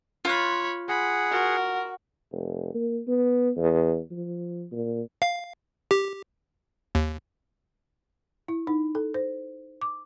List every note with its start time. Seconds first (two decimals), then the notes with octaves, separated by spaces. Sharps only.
0.25 F4 C#5 B5 F#6
0.89 G#4 F#5 B5
1.31 F#4 A#4
2.32 F1
2.74 A#3
3.07 B3
3.57 E2
4.11 F3
4.72 A#2
5.22 F5
5.91 G4
6.95 D#2
8.48 E4
8.67 D#4
8.95 A4
9.14 C5
9.82 D6